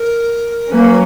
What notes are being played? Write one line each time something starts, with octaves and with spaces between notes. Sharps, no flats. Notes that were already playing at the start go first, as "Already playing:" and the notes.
Already playing: A#4
F#3 A#3 C#4 B4